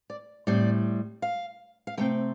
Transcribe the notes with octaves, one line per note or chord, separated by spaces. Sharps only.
D5
A2 G3 C4 D5
F5
F5
C3 A3 C4 G5